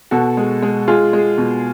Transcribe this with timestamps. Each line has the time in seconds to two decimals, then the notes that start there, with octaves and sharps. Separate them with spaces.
0.11 B2 F#4 A4
0.37 G#3
0.62 G#3
0.88 G#3 F4 G#4
1.13 G#3
1.38 B2